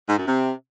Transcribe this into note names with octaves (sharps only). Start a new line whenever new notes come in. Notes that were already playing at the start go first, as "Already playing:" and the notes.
G#2
F#2
C3